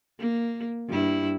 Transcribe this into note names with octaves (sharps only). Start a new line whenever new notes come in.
A#3
G2 E4